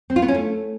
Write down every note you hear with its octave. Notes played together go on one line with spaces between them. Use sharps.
C4
F4
B3
C#4
A3